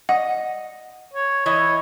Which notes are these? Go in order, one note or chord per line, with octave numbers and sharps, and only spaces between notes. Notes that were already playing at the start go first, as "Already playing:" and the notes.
D#5 F#5
C#5
E3 E4 C#5 D#5